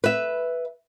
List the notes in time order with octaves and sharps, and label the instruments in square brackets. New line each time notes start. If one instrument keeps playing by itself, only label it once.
[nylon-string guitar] B4 E5